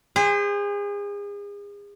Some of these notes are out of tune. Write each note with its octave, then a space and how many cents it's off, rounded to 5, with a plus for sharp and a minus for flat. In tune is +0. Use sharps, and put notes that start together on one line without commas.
G#4 -35 C5 +0